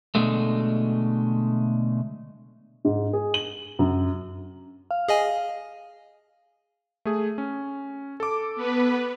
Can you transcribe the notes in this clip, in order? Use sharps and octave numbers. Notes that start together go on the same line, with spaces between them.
B2 D3 F#3 G#3 A3
G#2
G#4
F#7
F#2
F5
G#4 D#5 G#5
A3 G#4
C#4
A4 D6
B3 B4